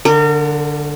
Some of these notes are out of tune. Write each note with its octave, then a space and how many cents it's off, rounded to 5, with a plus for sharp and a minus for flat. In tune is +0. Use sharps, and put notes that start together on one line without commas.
D3 +0 A#4 -35